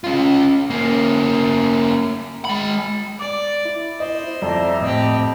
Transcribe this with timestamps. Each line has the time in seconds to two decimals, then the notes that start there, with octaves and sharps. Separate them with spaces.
0.04 C#4 F4
0.70 A#3 C#4
2.45 G#3 B5
3.19 D5 D6
3.65 E4
4.00 C5 D#5
4.42 F2 D5 E5 A#5
4.81 A2 C4 G4 D#5